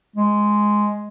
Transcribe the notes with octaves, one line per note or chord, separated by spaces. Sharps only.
G#3